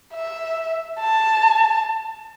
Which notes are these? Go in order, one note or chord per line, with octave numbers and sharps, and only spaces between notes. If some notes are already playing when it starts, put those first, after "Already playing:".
E5
A5